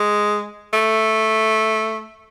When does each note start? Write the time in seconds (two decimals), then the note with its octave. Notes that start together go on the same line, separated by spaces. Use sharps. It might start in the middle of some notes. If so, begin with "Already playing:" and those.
Already playing: G#3
0.73 A3